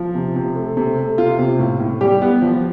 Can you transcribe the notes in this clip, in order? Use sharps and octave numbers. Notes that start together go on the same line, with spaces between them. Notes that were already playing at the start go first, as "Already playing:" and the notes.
Already playing: F3
C3
C3
A3
C3
A3
C3 F4
C3
A2
A2
G3 G4
B3
F3